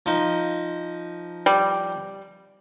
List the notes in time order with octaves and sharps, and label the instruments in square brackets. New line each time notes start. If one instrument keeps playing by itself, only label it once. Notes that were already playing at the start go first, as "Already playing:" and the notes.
[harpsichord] F3 D#4
[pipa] G3